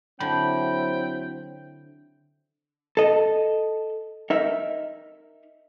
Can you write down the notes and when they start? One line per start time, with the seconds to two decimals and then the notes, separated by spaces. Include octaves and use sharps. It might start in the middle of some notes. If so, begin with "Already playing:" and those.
0.20 D3 F#3 C4 E4 G5 B5
2.97 A4 D#5
4.30 D#4 A#4 E5